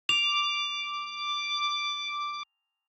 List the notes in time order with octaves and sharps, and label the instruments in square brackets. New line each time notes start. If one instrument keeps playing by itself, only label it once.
[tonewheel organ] D6 [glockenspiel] F7